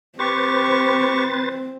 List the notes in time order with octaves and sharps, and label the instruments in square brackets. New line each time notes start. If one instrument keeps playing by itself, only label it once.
[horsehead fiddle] C4 [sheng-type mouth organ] G4 C#6 [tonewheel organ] B4 C5 A6